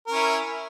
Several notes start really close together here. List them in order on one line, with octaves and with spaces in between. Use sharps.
A#4 C#4 E4